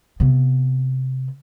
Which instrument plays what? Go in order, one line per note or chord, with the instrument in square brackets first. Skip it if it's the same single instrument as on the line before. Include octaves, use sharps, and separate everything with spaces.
[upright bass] C3 B3